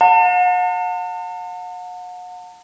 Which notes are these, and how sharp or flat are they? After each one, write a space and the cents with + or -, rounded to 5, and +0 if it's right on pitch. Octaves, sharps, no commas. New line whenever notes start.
F#5 -40 A5 +45